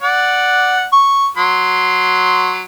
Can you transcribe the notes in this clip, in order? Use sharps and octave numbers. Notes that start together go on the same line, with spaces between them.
D5 F#5
C#6
F#3 C6